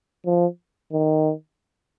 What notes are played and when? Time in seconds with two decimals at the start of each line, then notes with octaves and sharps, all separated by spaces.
0.26 F3
0.93 D#3